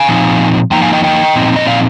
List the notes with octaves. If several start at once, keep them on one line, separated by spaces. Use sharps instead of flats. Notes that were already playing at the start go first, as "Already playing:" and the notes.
Already playing: F5 G#5
A#2 F3 C4 D#4
F3 A#3 D#4 G5 A#5
F5 G#5
D#5 G5
D#5 G5
A#2 F3 C4 D#4
D#5
D5 F5